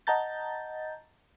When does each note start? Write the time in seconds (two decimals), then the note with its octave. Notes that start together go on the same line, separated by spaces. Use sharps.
0.07 D#5 F#5 A5 A#5 G6 A6